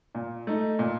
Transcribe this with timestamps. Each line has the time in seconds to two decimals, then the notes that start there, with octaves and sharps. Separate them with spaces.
0.15 A#2
0.47 A3 D#4
0.79 A#2